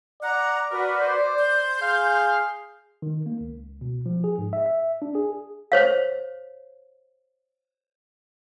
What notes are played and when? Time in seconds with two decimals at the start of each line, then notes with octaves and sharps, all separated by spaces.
0.23 D5 F#5 A#5
0.71 F#4 A#4 B4
1.00 C5
1.39 C6 G6
1.81 G#4 F5
3.02 D#3
3.26 A#3
3.41 C#2
3.81 B2
4.06 F3
4.24 G#4
4.38 G#2
4.53 E5
4.66 E5
5.02 D4
5.15 G#4
5.72 C5 C#5 F5